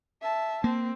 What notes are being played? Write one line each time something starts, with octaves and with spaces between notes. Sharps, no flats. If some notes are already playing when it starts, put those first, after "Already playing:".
E5 A5
A#3 C4